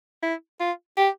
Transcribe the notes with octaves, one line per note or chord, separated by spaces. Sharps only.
E4
F4
G4